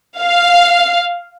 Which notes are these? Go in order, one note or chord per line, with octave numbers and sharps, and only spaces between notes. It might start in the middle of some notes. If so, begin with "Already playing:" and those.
F5